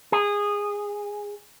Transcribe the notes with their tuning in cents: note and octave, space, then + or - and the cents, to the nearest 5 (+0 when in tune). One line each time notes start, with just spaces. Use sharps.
G#4 -15